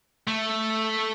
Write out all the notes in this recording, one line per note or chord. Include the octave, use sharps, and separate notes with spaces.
A3